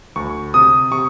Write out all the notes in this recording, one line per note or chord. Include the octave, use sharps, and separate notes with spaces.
D2 C#6
C3 D#6
C3 C#6